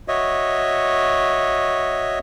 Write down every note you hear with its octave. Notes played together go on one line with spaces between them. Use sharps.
F#4 C#5 D#5 E5